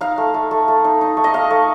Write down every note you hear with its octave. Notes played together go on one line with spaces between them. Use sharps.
D#4 F5
A3
A3
A3
A3
D#4
D#4
A3
D#5
A3 F5
A3